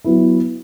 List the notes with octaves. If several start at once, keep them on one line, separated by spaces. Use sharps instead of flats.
F#3 B3 E4